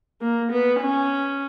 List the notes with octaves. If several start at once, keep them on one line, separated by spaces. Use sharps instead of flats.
A#3
B3
C#4